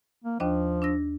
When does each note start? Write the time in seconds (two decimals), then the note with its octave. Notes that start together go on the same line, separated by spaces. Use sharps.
0.24 A#3
0.40 D#2 F3 D4 D#5
0.82 D4 E6 A#6